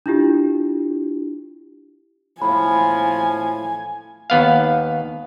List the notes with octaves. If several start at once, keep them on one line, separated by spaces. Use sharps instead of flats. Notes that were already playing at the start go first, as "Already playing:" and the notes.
D4 E4 F4 G4
A2 F3 G#5 B5
D#2 B3 F5